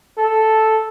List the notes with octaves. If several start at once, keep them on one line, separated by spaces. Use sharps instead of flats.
A4